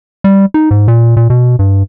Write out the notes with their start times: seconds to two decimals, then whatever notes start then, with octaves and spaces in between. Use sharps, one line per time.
0.24 G3
0.54 D#4
0.71 G#2
0.88 A#2
1.17 A#2
1.30 B2
1.59 G2